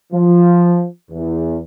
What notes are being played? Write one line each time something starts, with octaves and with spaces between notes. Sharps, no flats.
F3
E2